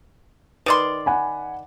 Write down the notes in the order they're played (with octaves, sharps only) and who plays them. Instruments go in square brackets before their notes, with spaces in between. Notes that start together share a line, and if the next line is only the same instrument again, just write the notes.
[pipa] D#3 D5 C6 [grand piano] B4
[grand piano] F#5 G#5 B5